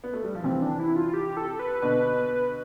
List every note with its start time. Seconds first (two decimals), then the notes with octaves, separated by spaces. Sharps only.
0.04 B3
0.14 A3
0.24 G3
0.35 F3
0.44 C3 E3 C4
0.62 D4
0.80 E4
0.96 F4
1.09 F4
1.14 G4
1.37 A4
1.59 B4
1.82 B2 D3 B4